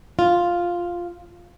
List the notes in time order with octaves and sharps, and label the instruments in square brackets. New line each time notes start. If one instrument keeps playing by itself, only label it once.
[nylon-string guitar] F4